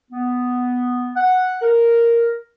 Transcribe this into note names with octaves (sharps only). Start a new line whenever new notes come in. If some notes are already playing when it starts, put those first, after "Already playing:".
B3
F#5
A#4